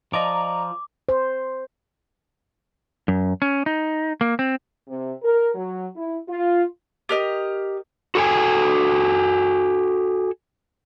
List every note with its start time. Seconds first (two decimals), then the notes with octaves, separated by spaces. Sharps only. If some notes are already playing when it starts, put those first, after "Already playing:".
0.13 F3 D5 D#5 A#5 D6
1.09 C5
3.08 F#2
3.42 C#4
3.66 D#4
4.21 A#3
4.39 C4
4.88 C3
5.22 A#4
5.55 F#3
5.96 E4
6.29 F4
7.09 G4 A#4 D#5
8.15 F#4 A4 G5 G#5